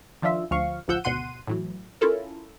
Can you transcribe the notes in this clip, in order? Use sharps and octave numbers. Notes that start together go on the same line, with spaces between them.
D#3 F3 D4 F4 E5
D2 F3 F5 C#6
A1 D2 F3 F#5 E6 G6
G#1 D2 B2 F#5 C6 D#7
A2 E3 F#3
C#4 E4 F4 A4 A#4